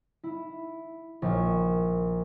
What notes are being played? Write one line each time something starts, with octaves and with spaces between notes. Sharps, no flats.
E4
A#1